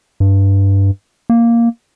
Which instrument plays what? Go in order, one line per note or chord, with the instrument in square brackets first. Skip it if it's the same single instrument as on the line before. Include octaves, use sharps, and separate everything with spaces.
[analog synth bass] G2
A#3